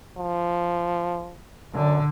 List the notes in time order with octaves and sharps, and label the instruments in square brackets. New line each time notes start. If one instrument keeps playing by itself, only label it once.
[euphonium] F3
[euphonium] F#2 [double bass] D3